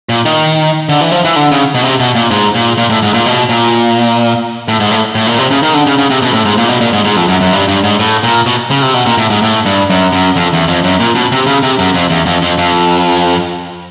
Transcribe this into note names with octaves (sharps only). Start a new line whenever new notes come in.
A#2
D#3
D3
E3
F3
E3
D3
C#3
B2
C3
B2
A#2
G#2
A#2
A#2
A2
G#2
A#2
B2
A#2
A2
G#2
A2
A2
A#2
C3
C#3
D#3
D3
C#3
C#3
C3
B2
A2
G#2
A#2
B2
A#2
G#2
G#2
F2
F#2
F#2
G2
G2
G#2
A2
A#2
B2
C#3
C3
B2
A#2
A2
G#2
A2
G2
F#2
F#2
F2
E2
F2
F#2
A#2
B2
C3
C#3
C3
F#2
F2
E2
F2
F2
F2